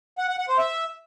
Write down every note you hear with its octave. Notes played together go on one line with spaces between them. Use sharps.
F#5
F#5
F#5
C5
E5